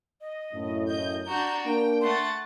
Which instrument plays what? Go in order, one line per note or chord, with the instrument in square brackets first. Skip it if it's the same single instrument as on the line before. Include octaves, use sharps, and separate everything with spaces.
[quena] D#5
[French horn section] F#2 A2
[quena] D#5 [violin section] G6
[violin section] D4 F#4 G6 [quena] A#5
[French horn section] A#3 D4 [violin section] G5
[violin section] A3 F#5 A6 [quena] C6